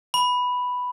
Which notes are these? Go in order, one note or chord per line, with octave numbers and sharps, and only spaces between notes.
B5